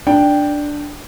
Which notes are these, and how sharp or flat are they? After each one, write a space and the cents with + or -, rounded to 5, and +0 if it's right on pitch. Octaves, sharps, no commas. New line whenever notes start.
D4 +0 G5 +0